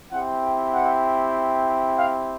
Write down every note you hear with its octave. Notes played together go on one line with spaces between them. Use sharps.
C4 E4 G4 F#5
G5
F#5
F5